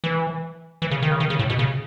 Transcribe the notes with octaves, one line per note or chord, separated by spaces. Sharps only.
E3
E3
C#3
D#3
C#3
D#3
C#3
A2
B2
C#3